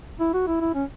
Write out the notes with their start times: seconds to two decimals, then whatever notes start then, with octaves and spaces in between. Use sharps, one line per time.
0.20 E4
0.33 F#4
0.47 E4
0.61 E4
0.74 C#4